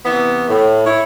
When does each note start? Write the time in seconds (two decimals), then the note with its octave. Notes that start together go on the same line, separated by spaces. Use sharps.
0.06 C3 E3 B3
0.48 A2
0.85 E4 C#5